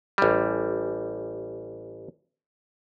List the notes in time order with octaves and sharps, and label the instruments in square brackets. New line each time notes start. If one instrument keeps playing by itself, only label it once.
[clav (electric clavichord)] A1 G3